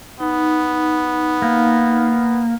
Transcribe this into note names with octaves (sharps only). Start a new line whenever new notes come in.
B3 D#4
A#3